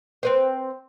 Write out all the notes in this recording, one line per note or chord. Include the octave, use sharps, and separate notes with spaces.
C4 B4 C5